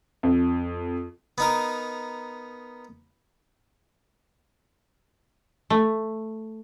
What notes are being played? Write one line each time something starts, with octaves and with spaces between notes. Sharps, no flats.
F2
B3 D#4 A#4
A3